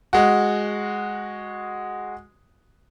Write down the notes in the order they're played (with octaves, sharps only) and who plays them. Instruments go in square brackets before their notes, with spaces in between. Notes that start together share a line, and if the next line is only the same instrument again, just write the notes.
[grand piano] G#3 F#4